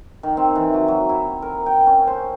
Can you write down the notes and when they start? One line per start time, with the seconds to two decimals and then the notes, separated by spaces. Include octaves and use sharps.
0.23 D#3
0.37 C4
0.55 E3
0.74 F#3
0.88 F#3
1.09 E4
1.42 A#4
1.66 G5
1.87 C#4
2.07 C5